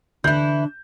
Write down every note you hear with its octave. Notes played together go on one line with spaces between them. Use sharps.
D3 E3 D4 E4 G6